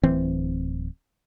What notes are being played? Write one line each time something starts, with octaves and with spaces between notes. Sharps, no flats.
D1 E3 C4